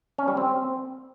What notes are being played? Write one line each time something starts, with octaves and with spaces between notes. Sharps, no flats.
C#4
G3
C4